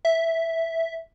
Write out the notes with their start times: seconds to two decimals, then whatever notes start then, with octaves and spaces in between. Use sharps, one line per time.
0.05 E5